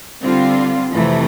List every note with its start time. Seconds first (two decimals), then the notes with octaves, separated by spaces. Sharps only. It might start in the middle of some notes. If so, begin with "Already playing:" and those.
0.21 D3 G3 C4 F4
0.92 F2 C3 E3 A3